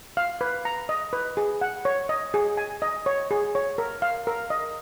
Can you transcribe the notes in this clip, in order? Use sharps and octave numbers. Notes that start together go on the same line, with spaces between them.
F5
B4
A#5
D#5
B4
G#4
F#5
C#5
D#5
G#4
G#5
D#5
C#5
G#4
C#5
A#4
F5
A#4
D#5